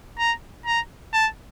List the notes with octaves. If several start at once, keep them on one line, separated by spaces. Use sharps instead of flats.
A#5
A#5
A5